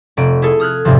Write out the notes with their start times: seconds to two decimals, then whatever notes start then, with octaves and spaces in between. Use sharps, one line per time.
0.17 F1 D7 D#7
0.42 E4 G#4 A4
0.60 D#6 F6 F#6 G#6
0.85 E2 G#2 C3 F3